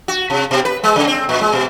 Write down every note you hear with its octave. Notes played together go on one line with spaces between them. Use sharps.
F#4
C3
B2
B4
G#3
C#3
C4
A#2
G#3
B2